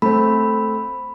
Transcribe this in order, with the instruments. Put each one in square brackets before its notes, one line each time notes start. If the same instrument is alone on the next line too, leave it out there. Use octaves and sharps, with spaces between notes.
[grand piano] A3 C4 [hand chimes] B5